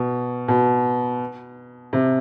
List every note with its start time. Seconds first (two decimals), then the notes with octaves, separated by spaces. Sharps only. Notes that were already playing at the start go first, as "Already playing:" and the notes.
Already playing: B2
0.48 B2
1.93 C3